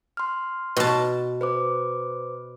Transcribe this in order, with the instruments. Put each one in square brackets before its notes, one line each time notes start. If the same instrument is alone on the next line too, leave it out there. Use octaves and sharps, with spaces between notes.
[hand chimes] C6 F6
[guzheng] B2 A5
[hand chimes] B4 C5 D6